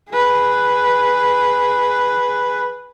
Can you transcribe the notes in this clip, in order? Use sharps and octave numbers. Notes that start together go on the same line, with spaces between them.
G#4 B4